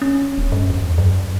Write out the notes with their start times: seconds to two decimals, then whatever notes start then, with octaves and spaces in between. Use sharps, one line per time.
0.02 C#4
0.38 D#1
0.52 G2
0.70 E2
0.98 F#2